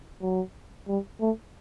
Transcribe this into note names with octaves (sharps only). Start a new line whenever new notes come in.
F#3
G3
A3